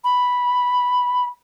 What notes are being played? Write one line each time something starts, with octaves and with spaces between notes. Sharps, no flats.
B5